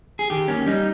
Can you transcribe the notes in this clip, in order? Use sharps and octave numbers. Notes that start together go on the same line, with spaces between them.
G#4
D#3 G4
A#3 C#4
G3 D#4